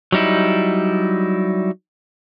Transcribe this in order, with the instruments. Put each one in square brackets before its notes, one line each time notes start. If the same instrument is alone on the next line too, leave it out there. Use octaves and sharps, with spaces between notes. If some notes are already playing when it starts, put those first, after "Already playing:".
[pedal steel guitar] F#3 G3 D#4 E4